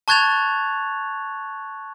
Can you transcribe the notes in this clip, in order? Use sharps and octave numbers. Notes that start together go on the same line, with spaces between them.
A5 C#6 F#6 G#6 A6 F7